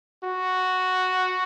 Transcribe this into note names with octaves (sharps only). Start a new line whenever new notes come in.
F#4